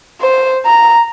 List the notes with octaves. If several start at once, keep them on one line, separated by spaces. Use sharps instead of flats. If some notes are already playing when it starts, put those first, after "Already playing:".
C5
A#5